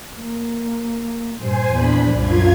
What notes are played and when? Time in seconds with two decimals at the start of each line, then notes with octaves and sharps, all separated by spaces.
0.21 A#3
1.36 G2 A#2 C5 G#5
1.72 E2 A#2 D4 B5
2.12 C2 F#2 F4 G#6